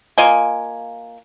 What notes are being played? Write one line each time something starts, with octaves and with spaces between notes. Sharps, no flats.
A#3 F4 D#5 G#5